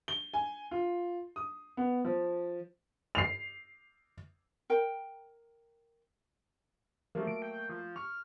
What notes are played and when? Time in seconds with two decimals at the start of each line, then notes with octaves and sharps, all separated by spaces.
0.08 G7
0.34 G#5
0.71 F4
1.36 D#6
1.77 B3
2.05 F3
3.15 C7 F7
4.70 A#4 G5
7.15 F3 F#3 A3 A#3
7.27 D7
7.42 G5
7.69 F3
7.96 C#6 F6